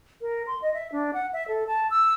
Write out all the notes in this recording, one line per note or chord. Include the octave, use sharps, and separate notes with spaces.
A#4
C6
D#5
E5
D4
F#5
E5
A4
A5
E6